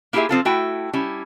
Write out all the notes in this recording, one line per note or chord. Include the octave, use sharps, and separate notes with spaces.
A#3 E4 F4 G4 G#4 E5
F3 C4 F4 A4
A3 E4 F#4 G5
G3 C#4 E4